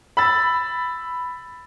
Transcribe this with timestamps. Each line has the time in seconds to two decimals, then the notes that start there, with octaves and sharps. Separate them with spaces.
0.17 B5 E6 A6